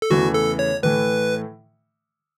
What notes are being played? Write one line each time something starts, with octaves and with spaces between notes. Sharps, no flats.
A4
E2 C#3 E3 A3 F#4
A4
C#5
A2 E3 A3 B4